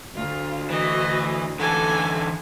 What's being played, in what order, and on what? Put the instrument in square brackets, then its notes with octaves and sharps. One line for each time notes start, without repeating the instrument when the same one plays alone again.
[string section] D2 [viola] F4
[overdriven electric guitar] E3 [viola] F#4 D#5
[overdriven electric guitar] D3 E3 [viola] A4 G#5